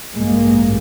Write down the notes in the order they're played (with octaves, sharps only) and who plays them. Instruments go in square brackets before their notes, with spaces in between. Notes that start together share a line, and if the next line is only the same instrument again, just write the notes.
[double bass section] A1 G2 G#3 A#3